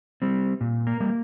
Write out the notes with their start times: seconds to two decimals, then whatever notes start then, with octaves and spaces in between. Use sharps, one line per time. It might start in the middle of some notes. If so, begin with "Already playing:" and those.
0.22 G3 C4
0.61 A#2
0.87 A#3 A#4
1.00 G3 A#3